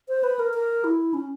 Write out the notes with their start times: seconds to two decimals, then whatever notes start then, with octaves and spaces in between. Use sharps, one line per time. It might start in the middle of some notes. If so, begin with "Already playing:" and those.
0.09 C5
0.24 B4
0.39 A#4
0.54 A#4
0.84 E4
1.14 C#4